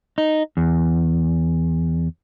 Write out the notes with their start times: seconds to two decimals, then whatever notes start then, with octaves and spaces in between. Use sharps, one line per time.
0.18 D#4
0.57 E2